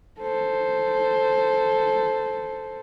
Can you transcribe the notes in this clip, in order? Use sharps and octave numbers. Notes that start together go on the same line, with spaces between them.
A4 C5